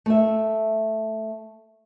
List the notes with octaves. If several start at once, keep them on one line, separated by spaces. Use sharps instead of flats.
A3 E5